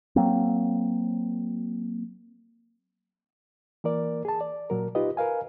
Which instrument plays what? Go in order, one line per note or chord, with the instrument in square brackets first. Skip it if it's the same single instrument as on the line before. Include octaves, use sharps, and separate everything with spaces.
[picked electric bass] F#3 A#3 C4
[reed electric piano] E3 A#3 A#4 D5
G#4 A5
D5
A#2 F#3 A#4
D#4 F4 G4 B4 D#5
A#4 B4 F5 G#5